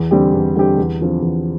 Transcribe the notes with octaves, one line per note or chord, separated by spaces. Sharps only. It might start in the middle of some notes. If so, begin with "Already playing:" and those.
Already playing: E2
D3 G3 C4 G4
E2
D3 G3 C4 G4
E2
D3 F3 C4
E2